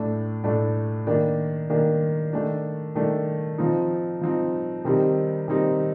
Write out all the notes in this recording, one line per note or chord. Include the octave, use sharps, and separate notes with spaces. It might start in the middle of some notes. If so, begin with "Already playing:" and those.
Already playing: A2 A3 D4
A2 A3 D4
D#3 A#3 D4
D#3 A#3 D4
D#3 A3 D4
D#3 A3 D4
F3 C4 D#4
F3 C4 D#4
C3 D#3 G3 C4 D#4
C3 D#3 G3 C4 D#4